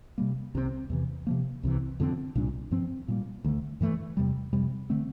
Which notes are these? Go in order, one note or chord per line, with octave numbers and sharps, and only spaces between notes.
C3 G3 A#3
C2 C3 F3 C4
E2 C3 E3
C3 F3 A#3
C2 C3 E3
F2 D3 F3 C4
C2 A#2 G3 D4
G2 F3 C4
A#2 G3 A#3
D2 D3 A3
G2 E3 A3
E2 C3 G3
F2 C3 G3
D3 A3 C4